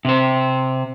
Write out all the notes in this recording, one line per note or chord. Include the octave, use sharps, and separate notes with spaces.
C3 C5